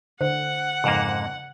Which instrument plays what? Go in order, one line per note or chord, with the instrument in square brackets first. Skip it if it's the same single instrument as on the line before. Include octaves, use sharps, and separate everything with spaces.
[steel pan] D3 [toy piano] C5 [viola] F#5
[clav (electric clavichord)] F2 G#2 A#3 [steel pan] C#3